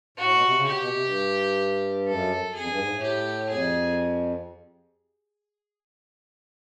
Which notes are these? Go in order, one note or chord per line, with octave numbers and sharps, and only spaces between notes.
A2 F#4
B2
C3
C#3
B2 G4
B2
C3
G2
F#2 A4
F2 G#4
G2
G#2
A2
G4
F2 G#4